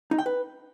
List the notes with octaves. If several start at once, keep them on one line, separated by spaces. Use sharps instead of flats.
D#4
G5
B4